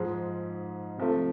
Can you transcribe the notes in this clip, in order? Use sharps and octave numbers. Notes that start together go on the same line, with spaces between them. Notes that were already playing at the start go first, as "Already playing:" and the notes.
Already playing: G#2 F3 G#3
C3 F3 A3